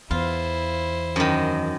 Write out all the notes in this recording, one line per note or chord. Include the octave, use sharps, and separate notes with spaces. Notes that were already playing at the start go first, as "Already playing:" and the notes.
E2 E4 F4 C5
F#2 D#3